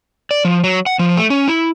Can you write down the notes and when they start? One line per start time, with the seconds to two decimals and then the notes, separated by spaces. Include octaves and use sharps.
0.31 D5
0.45 F3
0.64 F#3
0.86 F#5
0.99 F3
1.17 A3
1.30 C#4
1.48 E4